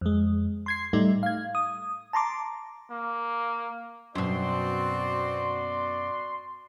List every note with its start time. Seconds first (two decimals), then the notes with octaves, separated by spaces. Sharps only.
0.01 F2 G#3
0.66 C6 G#6 C7
0.93 A2 G3 A3 D#4
1.23 F5 G#6
1.55 D#6
2.13 A5 A#5 C6 D6
2.91 A#3
4.15 F#2 B2 C4 F#4 D5 C6